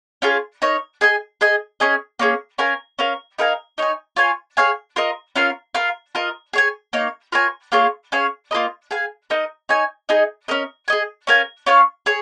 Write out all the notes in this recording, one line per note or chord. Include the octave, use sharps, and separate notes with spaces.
C#4 F4 G#4 F5
D#4 A#4 C#5
G#4 D#5 G#5
G#4 D#5 G#5
C#4 G#4 D#5 G#5
A#3 C#4 G#4
C#4 A#4 F5 G#5
C#4 A#4 F5
D#4 A#4 F5 G#5
D#4 C#5 G#5
F4 C#5 G#5
G#4 C#5 F5 G#5
F4 A#4 D#5
C#4 F4 A#4 F5
F4 A#4 F5
F4 A#4 D#5
G#4 C#5 G#5
A#3 D#4 C#5
F4 A#4 C#5 G#5
A#3 F4 G#4 C#5
C#4 G#4 C#5 F5
A#3 F4 A#4 D#5
G#4 F5 G#5
D#4 A#4 D#5
D#4 C#5 G#5
D#4 G#4 D#5 G#5
C#4 A#4 D#5
G#4 D#5 G#5
C#4 A#4 F5 G#5
C#4 F4 C#5 F5
G#4 C#5